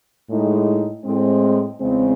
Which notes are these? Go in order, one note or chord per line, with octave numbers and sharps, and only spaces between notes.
A2 G#3 D#4
A2 G#3 C4
E2 C#3 G#3 C4